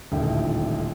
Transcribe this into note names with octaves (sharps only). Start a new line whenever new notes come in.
D#1 A1 D2 A#2 D#4 G5